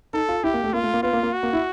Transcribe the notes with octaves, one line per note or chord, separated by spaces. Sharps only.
D#4 A4
F4
E4 G4
A#3
A3
A#3 F4
A3
A#3
B3 F4
A#3
A#3
F#4
A#3
E4